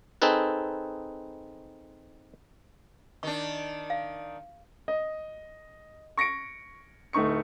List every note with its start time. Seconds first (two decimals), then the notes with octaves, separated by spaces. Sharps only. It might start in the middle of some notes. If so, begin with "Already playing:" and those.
0.22 C4 D#4 G#4 A4 B4
3.23 D#3 D4 C#6
3.90 F5
4.88 D#5
6.17 C#6 A#6 C#7 D7
7.13 D1 A3 D#4 C#6 C#7